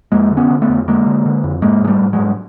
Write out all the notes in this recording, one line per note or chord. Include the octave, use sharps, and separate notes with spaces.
F2 G#3 A#3
D3
B3 C#4
D3
A3 B3
F2
D3 G#3 A#3
D3
D3
F2
G#2 G#3 A#3
G#2 G#3
G3 A3
G#2
F#3 G#3
G#2